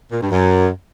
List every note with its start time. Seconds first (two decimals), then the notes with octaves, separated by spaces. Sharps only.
0.12 A#2
0.21 G2
0.31 F#2